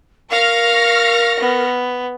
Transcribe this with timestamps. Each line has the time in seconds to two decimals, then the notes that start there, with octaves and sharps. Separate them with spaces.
0.31 A#4 F5 C#6 F6 A#6
1.40 B3